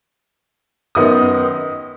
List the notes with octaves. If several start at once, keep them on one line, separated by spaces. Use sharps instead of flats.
F#2 D#3 B3 D#4 D#6